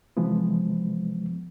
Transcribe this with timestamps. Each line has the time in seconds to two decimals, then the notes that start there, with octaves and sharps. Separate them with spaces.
0.17 C3 E3 F3 G#3 B3